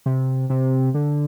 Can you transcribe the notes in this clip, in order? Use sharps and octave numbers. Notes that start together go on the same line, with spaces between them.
C3
C3
D3